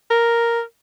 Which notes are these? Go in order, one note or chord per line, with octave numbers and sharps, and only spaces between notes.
A#4